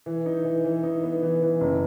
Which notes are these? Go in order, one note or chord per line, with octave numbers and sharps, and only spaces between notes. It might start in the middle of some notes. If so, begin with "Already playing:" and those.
E3
D#4
E3
E3
D#4
B3
E3
E3
F#1